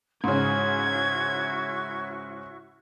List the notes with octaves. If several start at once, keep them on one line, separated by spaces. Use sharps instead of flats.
G#2 C#3 E4 F#4 C#6 G#6